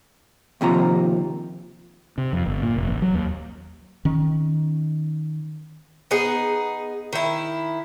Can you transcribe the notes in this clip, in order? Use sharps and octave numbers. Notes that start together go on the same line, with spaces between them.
D#2 C3 F3 A#5
C3
F2
G1
A#2
F1
A1
F#3
D#2
D#3 C#4
B3 D#4 G#4
D#3 E4